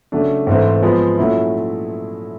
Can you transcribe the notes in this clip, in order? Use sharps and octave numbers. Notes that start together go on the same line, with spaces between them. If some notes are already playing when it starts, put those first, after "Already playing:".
C#3 F#3 A3 D4
G#2 E3 A3 C4
F3 G#3 B3
A#2 F#3 A3 C#4 E4